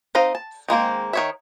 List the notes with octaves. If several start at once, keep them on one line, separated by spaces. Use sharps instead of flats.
C4 D#4 D#5 F5
A5
D#3 G#3 A#3 C4
D#3 C#5 E5